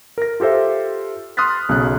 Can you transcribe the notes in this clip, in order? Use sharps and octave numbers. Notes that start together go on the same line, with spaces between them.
A#4 A#6
F4 G4 A4 C5 E5
C6 D#6 F6 F#6 A6 B6
B1 C#3 D#6 F#6